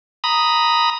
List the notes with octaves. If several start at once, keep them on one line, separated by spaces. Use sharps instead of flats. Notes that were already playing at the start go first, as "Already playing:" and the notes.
A#5 B5 D#6